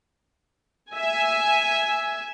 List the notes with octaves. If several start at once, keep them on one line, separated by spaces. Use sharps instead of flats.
E5 G#5